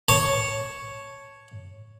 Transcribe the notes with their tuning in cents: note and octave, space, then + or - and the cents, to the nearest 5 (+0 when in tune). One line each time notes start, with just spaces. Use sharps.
C#5 +0 A5 +0